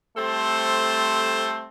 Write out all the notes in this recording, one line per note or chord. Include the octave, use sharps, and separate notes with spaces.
G3 A3 C4 A4 C5